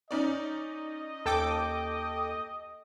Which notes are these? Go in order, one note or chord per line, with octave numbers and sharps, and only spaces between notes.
C#4 D#4 D5 D#5
D#2 A4 G5 D6